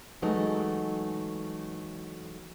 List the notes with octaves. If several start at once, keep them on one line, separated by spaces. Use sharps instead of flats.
E3 F#3 G#3 A3 D#4